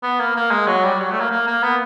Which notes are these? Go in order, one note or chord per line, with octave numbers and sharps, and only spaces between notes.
B3
A#3
A#3
G#3
F#3
G3
F#3
A3
A#3
A#3
A#3
B3